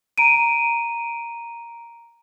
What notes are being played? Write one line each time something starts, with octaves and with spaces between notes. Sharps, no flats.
A#5 D7 D#7